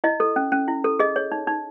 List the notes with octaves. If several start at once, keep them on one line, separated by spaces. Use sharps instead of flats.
E4 D#5
A4
C#4
C#4
E4
A4
G#4 D#5
C#5
D#4
D#4